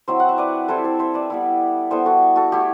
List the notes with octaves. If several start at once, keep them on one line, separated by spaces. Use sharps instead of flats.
F#3 C4 E4 C5 E5
F#5
E5
B4 D5
G3 C4 E4 A4 C5
A4 C5
C5 E5
B4 D5
G3 B3 E4
G3 B3 E4 A4 C5
F#4 A4
F#4 A4
A3 E4 G4